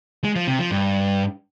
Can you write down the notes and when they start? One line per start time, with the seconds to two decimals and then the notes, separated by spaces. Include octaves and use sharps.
0.24 G#3
0.36 F3
0.47 C3
0.59 F3
0.71 G2